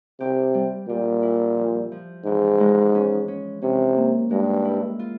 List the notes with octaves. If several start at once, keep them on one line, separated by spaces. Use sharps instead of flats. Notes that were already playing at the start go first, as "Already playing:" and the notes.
C3 G4
G3
A#2 G3
E4
F3
F3
G#2 E3
G#3
C#4
C#4
C3 C#4
A#3
G2 G#3
E4
F4